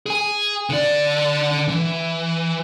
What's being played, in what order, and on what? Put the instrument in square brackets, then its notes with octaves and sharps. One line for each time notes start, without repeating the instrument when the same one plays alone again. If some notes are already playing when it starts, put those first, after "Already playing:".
[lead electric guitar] G#4 G#5
D3 D5
E3